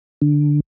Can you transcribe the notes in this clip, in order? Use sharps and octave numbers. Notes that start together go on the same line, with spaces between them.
D3